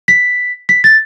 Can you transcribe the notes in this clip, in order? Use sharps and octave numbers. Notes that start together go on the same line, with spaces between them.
B6
B6
A6